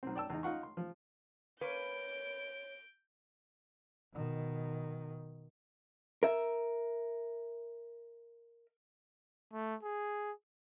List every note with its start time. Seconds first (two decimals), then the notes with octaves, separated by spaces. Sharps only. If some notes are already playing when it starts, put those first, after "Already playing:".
0.03 B1 C4
0.16 D5 G5 A5 E6
0.30 E2 D#4
0.43 D#4 F4 F#5 C#6
0.63 C6
0.77 F3
1.61 A#3 C#4 B4 C#5 G6 D7
4.13 B2 D#3
6.23 A#4 E5
9.53 A3
9.83 G#4